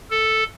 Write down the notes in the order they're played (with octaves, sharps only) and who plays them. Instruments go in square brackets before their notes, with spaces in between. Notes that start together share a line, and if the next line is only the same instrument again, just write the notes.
[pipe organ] A4